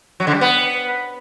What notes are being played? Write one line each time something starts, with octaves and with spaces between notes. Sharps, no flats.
F#3
D3
G3
B3